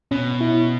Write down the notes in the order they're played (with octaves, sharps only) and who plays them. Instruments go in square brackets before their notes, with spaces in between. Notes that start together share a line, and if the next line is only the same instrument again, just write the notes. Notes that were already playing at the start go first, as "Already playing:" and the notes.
[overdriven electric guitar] B2 [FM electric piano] C#4
[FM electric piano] E4